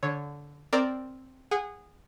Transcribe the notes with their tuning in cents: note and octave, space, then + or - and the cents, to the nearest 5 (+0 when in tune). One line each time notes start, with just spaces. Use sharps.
D3 -15 C#5 +0
C4 +0 A#4 +0 D5 +0
G#4 -20 F#5 +0